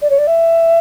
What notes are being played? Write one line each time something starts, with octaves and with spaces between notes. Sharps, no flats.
D5
C#5
D5
E5